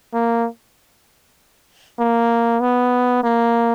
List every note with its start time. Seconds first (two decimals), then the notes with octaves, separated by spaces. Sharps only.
0.14 A#3
2.00 A#3
2.61 B3
3.24 A#3